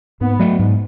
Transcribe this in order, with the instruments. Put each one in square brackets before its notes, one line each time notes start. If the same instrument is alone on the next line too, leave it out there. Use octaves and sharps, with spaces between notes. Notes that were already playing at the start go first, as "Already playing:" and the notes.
[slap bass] G#2 [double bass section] B3
[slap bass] F#3 A3
G#2